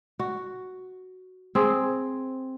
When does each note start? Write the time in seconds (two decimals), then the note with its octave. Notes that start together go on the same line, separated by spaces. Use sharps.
0.19 F#4
1.55 C4 G#4